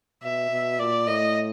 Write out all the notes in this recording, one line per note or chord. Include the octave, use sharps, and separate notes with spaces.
B2 E5
B2
A#2 D5
A2 D#5